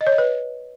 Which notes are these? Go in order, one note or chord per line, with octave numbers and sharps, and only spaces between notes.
D#5
C#5
D#5
B4